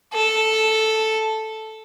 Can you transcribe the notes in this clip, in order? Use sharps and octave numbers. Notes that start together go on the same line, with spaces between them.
A4